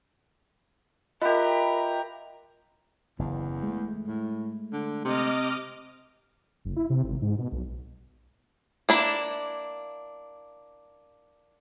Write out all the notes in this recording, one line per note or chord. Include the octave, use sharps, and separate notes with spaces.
F4 G4 A#4 B4 D#5 E5
F#1 E2
G#3 A3
A2
D3
C3 D#5 D6 F6
F#1
E4
C3
G#1
G#2
B2
B1
A#3 D4 E4